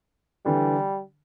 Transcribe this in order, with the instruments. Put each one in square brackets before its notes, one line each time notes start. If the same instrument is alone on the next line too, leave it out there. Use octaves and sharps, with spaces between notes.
[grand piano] D3 E3 [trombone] G3